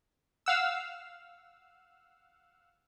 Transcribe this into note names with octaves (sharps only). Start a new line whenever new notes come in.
F5 F#5 E6